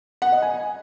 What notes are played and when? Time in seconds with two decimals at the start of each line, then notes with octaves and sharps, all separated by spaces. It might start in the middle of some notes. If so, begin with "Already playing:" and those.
0.22 F#5
0.32 D#5
0.42 G#5